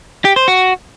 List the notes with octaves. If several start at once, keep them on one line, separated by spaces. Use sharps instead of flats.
G4
C5
F#4